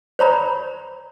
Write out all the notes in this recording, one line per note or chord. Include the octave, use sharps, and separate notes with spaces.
C5 C#5 A#5 B5